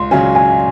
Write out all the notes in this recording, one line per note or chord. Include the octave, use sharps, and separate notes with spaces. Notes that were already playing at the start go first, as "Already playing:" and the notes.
Already playing: C#2 C6
C#3 F#3 C#4 G#5
G#5